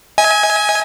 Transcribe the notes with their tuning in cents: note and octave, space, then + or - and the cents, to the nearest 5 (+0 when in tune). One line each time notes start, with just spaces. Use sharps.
D#5 +45 G#5 +0